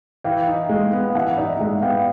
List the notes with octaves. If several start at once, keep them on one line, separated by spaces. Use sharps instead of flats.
E3 F5 G5
D#4
G#3
B3
F5
E3 E5 F#5
D#4 D5 E5
G#3 E5 F#5
B3 F5 G5